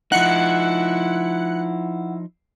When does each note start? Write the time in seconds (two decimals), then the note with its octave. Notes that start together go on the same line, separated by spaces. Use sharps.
0.12 F3 D#4 E4 F#5 F#6 C#7